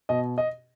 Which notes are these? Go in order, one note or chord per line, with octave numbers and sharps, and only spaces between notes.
B2 D#5
D#5